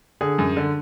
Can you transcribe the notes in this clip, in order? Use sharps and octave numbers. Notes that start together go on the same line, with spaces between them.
D3 G#4
F#2
D3